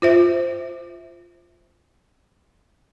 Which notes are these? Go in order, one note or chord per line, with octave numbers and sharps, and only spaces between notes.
F4 C5 E5